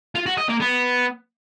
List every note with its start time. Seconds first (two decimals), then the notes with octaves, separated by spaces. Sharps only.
0.15 F4
0.26 F#4
0.38 D#5
0.49 A#3
0.60 B3